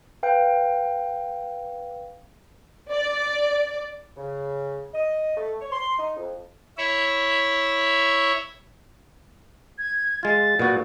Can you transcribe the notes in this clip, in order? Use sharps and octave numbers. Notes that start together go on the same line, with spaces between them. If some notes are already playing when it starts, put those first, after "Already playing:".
B4 F5 G5
D5
C#3
D#5
A3
C#5
C6
D#4
F2
E4 C#5 E5
G#6
G#3 F4 A6
A#2 B3 F#4